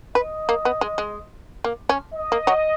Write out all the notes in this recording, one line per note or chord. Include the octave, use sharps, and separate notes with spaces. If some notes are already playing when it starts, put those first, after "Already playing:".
B4 D#5
A#3
B3
G#3
G#3
A#3
C#4
D#5
A#3
F#3